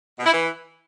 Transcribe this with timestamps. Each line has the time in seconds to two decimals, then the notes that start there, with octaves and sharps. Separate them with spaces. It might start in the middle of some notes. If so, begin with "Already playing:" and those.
0.19 B2
0.26 E4
0.33 E3